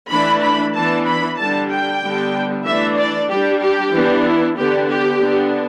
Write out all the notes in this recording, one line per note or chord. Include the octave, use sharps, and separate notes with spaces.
E3 A3 D4 B5
B5
E3 B3 D4 A5
B5
D3 G3 D4 A5
G5
D3 G3 B3 D4
E3 A3 D4 E5
D5
G3 D4 G4
G4
E3 B3 D4
E4
D3 B3 D4 G4
G4
D3 B3 D4